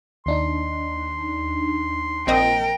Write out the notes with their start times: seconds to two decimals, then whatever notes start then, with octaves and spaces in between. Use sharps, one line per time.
0.26 D#2 D4 D#4 C6
2.27 A#1 C4 A#4 D#5 G5